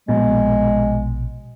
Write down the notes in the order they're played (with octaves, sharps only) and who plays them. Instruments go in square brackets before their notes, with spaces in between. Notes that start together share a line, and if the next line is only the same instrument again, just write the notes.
[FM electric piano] A#1 B2 [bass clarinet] G#3